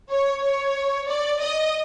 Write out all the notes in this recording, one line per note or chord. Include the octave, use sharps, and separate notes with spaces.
C#5
C#5
D5
D#5